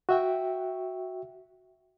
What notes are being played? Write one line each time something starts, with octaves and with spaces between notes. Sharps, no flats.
F#4 E5 G5